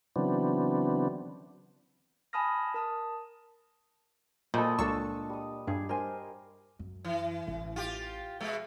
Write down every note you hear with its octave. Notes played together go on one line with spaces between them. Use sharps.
C#3 E3 F#3 B3 C4 D4
G#5 A5 B5 D#6 F6 A#6
A#4 A5 D#6
A#2 A4 C5 D#5 B5
C#2 D4 A4 A5 C#6 D#6 E6
G3 D#6
G2 G4 G#4
A#4 C5 G#5
F#2
E3
A1
F4 G4
B2 G#3